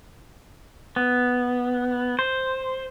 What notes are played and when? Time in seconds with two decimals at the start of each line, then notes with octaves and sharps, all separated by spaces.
0.96 B3
2.19 C5